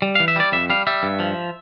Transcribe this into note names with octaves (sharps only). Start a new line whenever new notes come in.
G3
F5
E3
E5
G3 D5
F2 E5
G3 F5
G3 E5
G2
F3